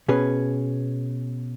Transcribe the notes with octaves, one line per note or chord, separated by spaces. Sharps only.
B2 C#4 G#4 B4